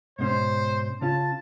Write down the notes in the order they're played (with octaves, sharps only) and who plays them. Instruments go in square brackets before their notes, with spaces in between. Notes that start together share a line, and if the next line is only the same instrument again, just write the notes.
[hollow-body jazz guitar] G#2 B2 C#4 [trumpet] C5
[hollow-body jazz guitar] C#3 C#4 F4 [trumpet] A5